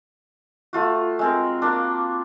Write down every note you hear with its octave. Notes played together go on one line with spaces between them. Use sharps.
A3 F4 F#4
G#3 C4 A#4
A#3 D4